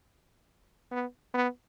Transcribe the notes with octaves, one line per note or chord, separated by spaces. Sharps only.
B3
B3